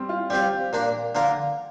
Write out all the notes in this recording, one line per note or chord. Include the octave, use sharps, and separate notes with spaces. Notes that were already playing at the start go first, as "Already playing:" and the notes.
Already playing: G3 C4
F4
G3 C4 F4 G4
A#2 A#3 D4
D3 A#3 F4 A#4